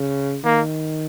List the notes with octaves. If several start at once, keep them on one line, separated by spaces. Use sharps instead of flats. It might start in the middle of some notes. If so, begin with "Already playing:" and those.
Already playing: C#3
D#3 A#3